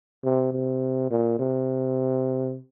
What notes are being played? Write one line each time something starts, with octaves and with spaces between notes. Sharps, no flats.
C3
C3
A#2
C3